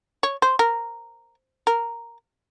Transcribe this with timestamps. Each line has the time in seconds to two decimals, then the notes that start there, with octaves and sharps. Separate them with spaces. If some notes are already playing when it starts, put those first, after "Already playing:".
0.23 C#5
0.42 C5
0.59 A#4
1.67 A#4